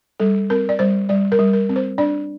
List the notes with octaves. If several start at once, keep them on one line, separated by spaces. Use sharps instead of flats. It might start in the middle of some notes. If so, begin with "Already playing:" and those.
G3 A4
C4 A#4
D5
G3 C5
G3 D5
A#4
G3
A#4
C4
C5
D4 D5